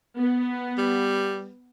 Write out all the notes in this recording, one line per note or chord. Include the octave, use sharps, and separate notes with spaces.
B3
G3